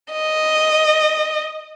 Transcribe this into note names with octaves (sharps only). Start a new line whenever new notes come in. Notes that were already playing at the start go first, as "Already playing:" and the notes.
D#5